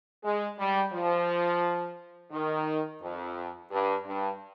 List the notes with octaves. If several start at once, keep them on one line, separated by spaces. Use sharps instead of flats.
G#3
G3
F3
D#3
F2
G2
G2